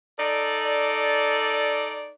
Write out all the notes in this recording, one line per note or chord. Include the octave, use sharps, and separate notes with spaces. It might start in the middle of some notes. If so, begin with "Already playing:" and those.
D#4 A4 D5